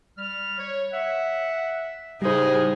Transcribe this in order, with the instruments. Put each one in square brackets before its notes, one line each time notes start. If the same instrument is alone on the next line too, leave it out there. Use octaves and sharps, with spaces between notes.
[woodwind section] G3 F6
C#5
E5 F#5
[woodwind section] A2 C#3 [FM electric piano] G3 C5 [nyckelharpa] D#4 G#4